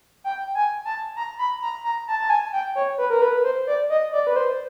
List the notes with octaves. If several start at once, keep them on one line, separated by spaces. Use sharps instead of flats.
G5
G#5
A5
A#5
B5
A#5
A#5
A5
A5
G#5
G5
C#5
B4
A#4
B4
C5
D5
D#5
D5
B4
C5